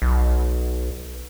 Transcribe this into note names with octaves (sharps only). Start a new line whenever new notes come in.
B1